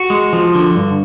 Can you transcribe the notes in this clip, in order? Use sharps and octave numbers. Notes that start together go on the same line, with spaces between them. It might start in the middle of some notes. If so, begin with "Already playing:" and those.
Already playing: F#4
G#3
F3
D3
G2